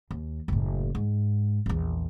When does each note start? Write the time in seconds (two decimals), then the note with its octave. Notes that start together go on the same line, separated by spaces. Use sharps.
0.11 D#2
0.48 F#1 A2
0.95 G#2
1.66 A#1 E2